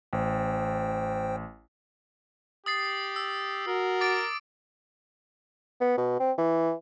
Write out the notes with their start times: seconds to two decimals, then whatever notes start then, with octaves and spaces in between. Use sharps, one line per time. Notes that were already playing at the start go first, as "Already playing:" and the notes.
0.13 A1 C5 G5
2.66 G4 D#6 A6 C7
3.16 E6
3.68 F#4 A#4
4.01 D6 A6 D7
5.81 B3
5.97 B2
6.20 C4
6.38 E3